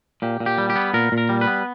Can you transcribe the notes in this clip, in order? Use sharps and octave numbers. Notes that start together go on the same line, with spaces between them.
A#2 G4
A#2
G4
G3
G4
B3
A#2 A#4
A#2
A#4
G3
B4
B3